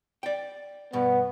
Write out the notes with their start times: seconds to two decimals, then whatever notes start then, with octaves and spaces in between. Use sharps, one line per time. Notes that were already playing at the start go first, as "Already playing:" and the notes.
0.23 D5 G5
0.93 G2 B2 B3